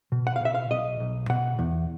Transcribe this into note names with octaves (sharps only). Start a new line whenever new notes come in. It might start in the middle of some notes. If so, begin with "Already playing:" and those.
B2
F#5
F5
B2 E5
F5
B1 D#5
B1
B2 F#5
E2